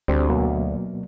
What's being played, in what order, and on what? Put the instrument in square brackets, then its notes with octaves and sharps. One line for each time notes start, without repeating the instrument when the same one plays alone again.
[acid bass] D2 [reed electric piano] G3 C4 D4
[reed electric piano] B2 F#3 A#3